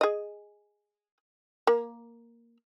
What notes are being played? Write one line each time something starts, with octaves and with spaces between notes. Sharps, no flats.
G#4 D#5
A#3